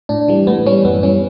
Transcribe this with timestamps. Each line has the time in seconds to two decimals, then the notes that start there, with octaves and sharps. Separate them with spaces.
0.09 A2 D4
0.28 E3 G3
0.47 A2 B3
0.66 E3 G3 C#4
0.85 F#2 B3
1.03 E3 G3 C#4